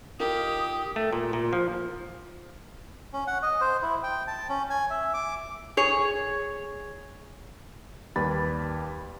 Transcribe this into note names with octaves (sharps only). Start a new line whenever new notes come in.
D#4 F4 G4 A#4 D#6
A3
A#2
A#2
F3
C#4
F#5
D#5
C5
E4
G5
A5
C#4
G#5
E5
D6
G#4 C#5
D#2 G3 B4 B5 A6